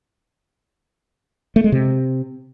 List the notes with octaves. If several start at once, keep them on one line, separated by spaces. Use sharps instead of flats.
A3
G#3
C3